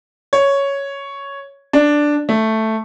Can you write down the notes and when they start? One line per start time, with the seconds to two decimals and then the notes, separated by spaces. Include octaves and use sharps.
0.33 C#5
1.73 D4
2.29 A3